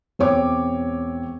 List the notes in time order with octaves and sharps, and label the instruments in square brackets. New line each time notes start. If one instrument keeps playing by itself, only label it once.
[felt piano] E1 C4 C#5 D6